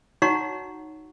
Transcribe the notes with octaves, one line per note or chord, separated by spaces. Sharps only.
D#4 F#4 C#5 F#5 A#5 C#6